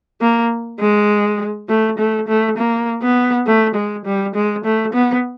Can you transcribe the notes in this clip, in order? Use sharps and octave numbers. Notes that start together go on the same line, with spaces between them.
A#3
G#3
A3
A3
A3
A#3
B3
A3
G#3
G3
G#3
A3
B3